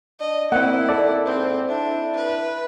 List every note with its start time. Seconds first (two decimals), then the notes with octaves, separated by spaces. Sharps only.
0.20 D4 D#5
0.52 A#3 C4 E4 F#5
0.89 D#3 A4 D5
1.25 G#2 C4
1.69 D4 E4
2.16 B4